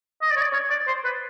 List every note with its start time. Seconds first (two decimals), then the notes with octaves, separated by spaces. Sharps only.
0.22 D#5
0.31 D5
0.37 C#5
0.42 D5
0.53 C#5
0.70 D5
0.88 C5
1.04 B4